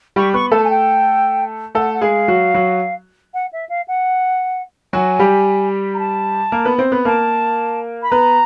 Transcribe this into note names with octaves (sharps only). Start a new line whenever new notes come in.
G3 G4 C#6
B3 B4 C#6
A3 A4 A5
G#5
G5
A3 A4 F#5
F#5
G#3 G#4 F5
F#3 F#4
F#3 F#4
F#5
E5
F5
F#5
F#3 F#4 G#5
G3 G4
A#5
A5
A#3 A#4
B3 B4
C4 C5
B3 B4
A#3 A#4 A5
B5
B3 B4 A#5